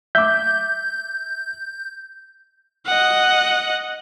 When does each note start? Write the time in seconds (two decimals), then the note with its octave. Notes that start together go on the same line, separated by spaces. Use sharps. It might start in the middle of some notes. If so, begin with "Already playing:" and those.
0.15 E5 D6 G6
2.87 D#5 F#5